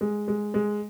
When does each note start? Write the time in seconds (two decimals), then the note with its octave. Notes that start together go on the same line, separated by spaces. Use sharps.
0.01 G#3
0.28 G#3
0.54 G#3